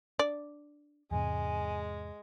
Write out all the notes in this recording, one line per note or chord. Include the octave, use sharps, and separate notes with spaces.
D4 D5
E2 G#2 C3 G#3 G#5